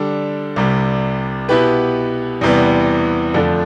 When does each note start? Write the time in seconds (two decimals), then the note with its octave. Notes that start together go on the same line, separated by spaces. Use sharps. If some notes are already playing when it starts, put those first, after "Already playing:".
Already playing: D3 G3 D4 A4
0.56 C2 C3 G3
1.49 B2 B3 E4 G4 B4
2.41 E2 C3 E3 G3 B3
3.34 F2 D3 F3 A3 D4